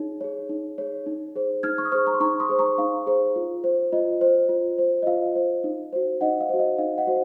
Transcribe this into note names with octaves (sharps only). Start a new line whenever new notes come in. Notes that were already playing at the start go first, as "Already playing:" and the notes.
Already playing: D#4 G#4 C#5
G#4 C#5
D#4
G#4 C#5
D#4
G#4 C5
D#4 F6 G#6
C#6 F6
D#6
G#4 C5 C#6 F6
A#5 C#6
C6
D#4 A#5 C#6
C6 D#6
G#4 C5
A#5 C#6
D#4 F5
G#4 C5
F4
C5
F4 D#5
C5
F4
C5
D#5
F4 F5
C5
D#4
F#4 C5
D#4 D#5 F#5
F5
F#4 C5
D#5
D#4 F5
D#5 F#5
F#4 C5